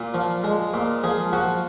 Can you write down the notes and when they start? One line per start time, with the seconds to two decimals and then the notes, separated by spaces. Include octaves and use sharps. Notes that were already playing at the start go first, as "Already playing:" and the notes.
Already playing: A#2
0.14 F3
0.44 G#3
0.74 A#2
1.03 F3 G#4
1.33 F3 F#4